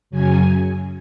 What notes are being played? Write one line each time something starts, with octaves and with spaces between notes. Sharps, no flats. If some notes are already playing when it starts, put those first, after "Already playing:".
F#2 C#3 F#3 G#5